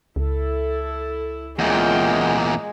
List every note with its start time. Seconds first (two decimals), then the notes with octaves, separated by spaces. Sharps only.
0.16 C#2 E4 A4
1.59 E2 A#2 G#3 C#4 F4 G5